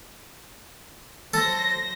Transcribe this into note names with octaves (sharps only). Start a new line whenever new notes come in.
F#3 A4 C5 A#6